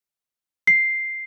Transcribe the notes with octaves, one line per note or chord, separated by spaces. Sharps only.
C7